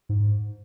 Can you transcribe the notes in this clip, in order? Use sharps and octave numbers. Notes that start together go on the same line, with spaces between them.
G#2